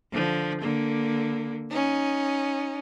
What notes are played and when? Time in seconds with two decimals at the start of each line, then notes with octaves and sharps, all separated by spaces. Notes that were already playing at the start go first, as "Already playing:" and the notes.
0.10 D3 F3
0.59 D3 A#3
1.70 C#4 D#4